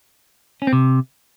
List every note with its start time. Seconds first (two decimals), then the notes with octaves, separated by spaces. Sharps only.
0.62 C#4
0.67 C4
0.73 C3